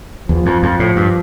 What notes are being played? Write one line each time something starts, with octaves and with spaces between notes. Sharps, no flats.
E2 F3
F2
F2
A2
G2